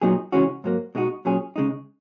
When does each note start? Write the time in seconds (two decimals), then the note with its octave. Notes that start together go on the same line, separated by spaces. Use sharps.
0.01 A#2 F#3 B3 D#4 G#4
0.32 C#3 E3 G#3 C#4 F#4
0.64 G#2 F#3 A#3
0.95 B2 G#3 D#4 F#4
1.25 A#2 F#3 C#4 G#4
1.56 C#3 G#3 D#4